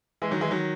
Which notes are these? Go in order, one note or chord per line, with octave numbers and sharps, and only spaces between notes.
E3 G#3
D#3 F#3
E3 G#3
D#3 F#3